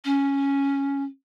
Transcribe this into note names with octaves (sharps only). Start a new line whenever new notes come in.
C#4